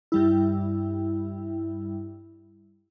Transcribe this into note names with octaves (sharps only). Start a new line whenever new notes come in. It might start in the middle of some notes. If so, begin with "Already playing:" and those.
G2 G3 E4